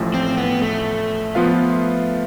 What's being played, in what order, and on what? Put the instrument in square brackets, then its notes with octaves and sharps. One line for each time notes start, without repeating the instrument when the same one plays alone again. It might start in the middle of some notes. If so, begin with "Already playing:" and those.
Already playing: [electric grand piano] A1 A2 F3
[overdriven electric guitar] C4
B3
A3
[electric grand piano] F3 B3 F4 B4 F5